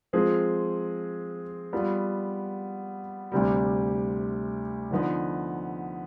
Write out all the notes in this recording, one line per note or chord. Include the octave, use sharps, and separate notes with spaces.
F3 G#3 C4 F4 G#4
G3 B3 F4 B4
D2 C3 G3
D3 F3 B3 D#4